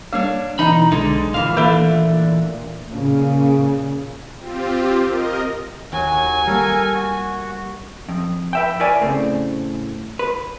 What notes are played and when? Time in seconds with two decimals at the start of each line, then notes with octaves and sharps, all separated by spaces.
0.13 G3 A#3 D4 C#5
0.59 B2 E3 D#4 D#5 A#5 B5
0.92 B1 D3 G#3 D#4
1.34 F2 A#2 E3 F5
1.57 D#3 E3 A3 A#3 D4 B5
2.90 A#2 C#3
4.38 C4 F4 G4
5.07 A#4 D#5
5.93 D#2 F#3 F#4 G#5
6.47 G3 A#3 A4 A#4 A#5
6.94 F#4
8.09 F2
8.53 B4 E5 G5
8.80 A#4 B4 C#5 D5 G#5
9.02 A2 C#3 A3 C4
10.19 B4